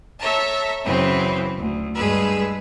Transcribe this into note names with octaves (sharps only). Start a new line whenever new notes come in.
A4 C#5 E5 A5 A#5
F#2 C#3 E3 C4 E4
D2
G2 G#3 G#4 B4 E6